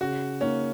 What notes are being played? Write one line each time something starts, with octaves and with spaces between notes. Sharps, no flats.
C#3 F#4
A#3 C#4 D#4